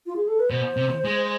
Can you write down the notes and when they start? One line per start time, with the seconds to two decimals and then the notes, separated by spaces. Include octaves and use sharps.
0.06 F4
0.16 G#4
0.28 A4
0.39 B4
0.50 B2 C5
0.77 C3
1.05 G#3